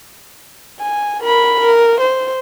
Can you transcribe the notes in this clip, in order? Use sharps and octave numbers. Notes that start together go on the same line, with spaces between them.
G#5
A#4 B5
A#4
C5